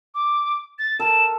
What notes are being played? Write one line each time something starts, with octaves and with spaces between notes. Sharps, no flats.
D6
A6
A4 A#4 E7